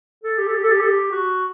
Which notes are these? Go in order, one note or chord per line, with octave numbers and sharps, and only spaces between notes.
A4
G4
A4
G4
A4
G4
A4
G4
F#4